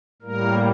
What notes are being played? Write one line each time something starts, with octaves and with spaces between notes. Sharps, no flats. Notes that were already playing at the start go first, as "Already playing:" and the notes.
A2 G3 A#3 A#4